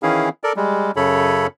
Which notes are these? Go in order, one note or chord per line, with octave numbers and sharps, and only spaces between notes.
D#3 E3 C#4 E4 G#4 F5
A4 A#4 D5
G3 G#3
F#2 C#3 A4 C#5 B5